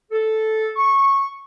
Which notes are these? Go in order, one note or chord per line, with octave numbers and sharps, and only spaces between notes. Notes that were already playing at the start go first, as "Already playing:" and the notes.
A4
C#6